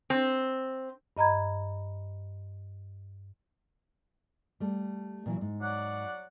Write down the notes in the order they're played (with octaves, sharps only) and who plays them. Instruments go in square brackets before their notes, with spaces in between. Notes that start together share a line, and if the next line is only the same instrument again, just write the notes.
[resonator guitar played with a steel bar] C4
[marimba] G2 D#5 A#5 B5 G#6
[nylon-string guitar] G3 A3
A#2 E3 F#3
G#2
[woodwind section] F#3 D5 F#5